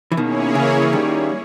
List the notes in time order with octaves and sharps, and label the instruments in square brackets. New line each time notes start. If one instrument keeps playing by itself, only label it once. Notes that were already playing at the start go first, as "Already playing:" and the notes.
[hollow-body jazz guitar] E3
[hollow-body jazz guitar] B2 D#3 [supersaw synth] A#3 C#4 E4 G#4 C#5
[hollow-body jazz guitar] C#3 E3
E3
D#3 G3